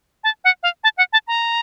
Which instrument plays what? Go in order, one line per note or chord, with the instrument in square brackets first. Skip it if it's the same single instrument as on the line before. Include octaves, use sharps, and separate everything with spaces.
[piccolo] A5
F#5
F5
A5
F#5
A5
A#5